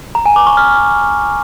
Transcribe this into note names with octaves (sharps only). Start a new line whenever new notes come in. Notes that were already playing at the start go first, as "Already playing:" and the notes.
A#5
G#5
D6
C#6
F6